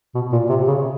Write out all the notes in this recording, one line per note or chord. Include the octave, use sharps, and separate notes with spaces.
B2
A#2
C3
C#3